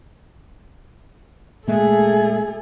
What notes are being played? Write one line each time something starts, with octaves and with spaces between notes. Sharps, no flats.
A#2 G#3 A3 G#4 A4 E5